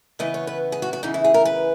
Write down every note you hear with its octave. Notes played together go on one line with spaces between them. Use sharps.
C#3 E3 B3 D#5
C#5
B4
G#4
F#4
F#4
E2 C#3 E3 D#4
E4
G#4
A#4
B4